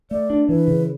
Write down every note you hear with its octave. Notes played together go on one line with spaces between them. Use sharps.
A3 D5
D4
E3 B4
C#3